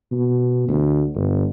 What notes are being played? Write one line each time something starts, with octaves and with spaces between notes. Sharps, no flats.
B2
D2
G1